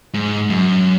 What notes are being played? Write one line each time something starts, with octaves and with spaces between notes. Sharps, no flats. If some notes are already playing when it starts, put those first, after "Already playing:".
G#2
F#2